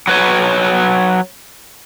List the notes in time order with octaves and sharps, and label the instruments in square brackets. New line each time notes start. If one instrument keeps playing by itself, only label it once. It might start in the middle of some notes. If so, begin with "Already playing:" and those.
[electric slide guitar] F#3 B4 C#5